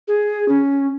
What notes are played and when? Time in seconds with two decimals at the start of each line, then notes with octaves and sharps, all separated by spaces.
0.08 G#4
0.48 C#4